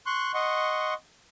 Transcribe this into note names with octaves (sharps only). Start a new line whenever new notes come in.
C6 C#6 F#6
D#5 F#5 C6 C#6